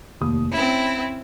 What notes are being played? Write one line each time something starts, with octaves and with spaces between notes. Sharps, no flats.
F1 D#2 D#6
C4 C#4 E4